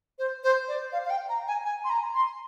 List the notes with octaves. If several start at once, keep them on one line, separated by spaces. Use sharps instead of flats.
C5
C5
D5
F5
F5
G5
A#5
G#5
G#5
C6
A#5
C6